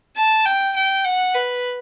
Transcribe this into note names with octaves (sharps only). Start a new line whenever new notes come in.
A5
G5
G5
F#5
B4